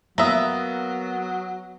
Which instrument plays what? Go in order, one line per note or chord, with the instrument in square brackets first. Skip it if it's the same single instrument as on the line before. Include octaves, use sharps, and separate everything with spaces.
[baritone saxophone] F#3 [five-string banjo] A#3 E5 [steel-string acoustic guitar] B3 [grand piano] D#6 E6 A#6